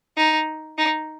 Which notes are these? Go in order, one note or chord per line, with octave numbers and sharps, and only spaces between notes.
D#4
D#4